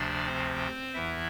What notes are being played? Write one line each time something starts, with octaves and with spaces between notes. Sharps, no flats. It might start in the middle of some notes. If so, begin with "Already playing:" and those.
Already playing: D2 C3 F3 D4 D5
C4 C5
E2 E3 E4 E5